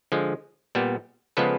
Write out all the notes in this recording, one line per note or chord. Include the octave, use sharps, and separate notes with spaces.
D3 F3 G#3
A#2 G3 B3
C#3 F3 G#3 B3 A4 B4